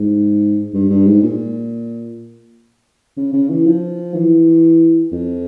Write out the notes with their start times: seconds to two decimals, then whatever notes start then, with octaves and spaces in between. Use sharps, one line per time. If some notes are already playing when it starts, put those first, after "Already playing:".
Already playing: G#2
0.74 G2
0.90 G2
1.06 G#2
1.23 A#2
3.17 C#3
3.34 C#3
3.50 E3
3.66 F3
4.15 E3
5.12 F2